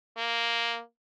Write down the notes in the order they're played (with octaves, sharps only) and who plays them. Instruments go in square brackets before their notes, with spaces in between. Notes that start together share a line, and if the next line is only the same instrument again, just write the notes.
[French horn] A#3